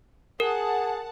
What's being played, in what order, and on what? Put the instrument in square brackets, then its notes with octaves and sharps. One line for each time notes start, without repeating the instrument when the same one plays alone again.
[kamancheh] G#4 [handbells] A#4 [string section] F#5 A5